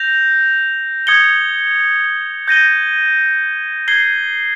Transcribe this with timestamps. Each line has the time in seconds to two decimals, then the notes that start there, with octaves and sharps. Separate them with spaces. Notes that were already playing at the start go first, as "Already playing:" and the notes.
Already playing: G6 A#6 F7
1.07 D#6 G#6 C#7 G7
2.48 G6 A#6 D#7 G7
3.88 G#6 C7 G7